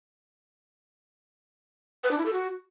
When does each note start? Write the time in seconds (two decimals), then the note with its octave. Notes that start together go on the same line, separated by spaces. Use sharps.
2.04 B4
2.11 D4
2.18 E4
2.26 A4
2.33 F#4